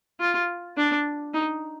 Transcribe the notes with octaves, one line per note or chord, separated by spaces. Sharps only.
F4
D4
D#4